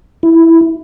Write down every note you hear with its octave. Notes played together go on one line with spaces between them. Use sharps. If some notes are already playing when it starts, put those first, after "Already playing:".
E4